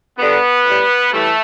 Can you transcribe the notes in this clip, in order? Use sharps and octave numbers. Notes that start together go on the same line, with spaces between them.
G2 D3 G3 B3
A2 G3
A2 E3 G3 A3